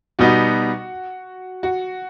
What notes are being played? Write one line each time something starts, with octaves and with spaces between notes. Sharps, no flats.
B2 G3 B3 D#4 F#4
F#4